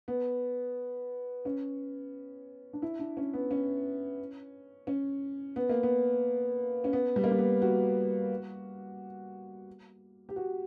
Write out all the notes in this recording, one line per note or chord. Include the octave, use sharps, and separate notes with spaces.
B3
C#4
D4
E4
D4
C#4
B3
C#4
C#4
B3
A#3
B3
C#4
B3
G3
A#3
G3
B3
F#4
G4
F#4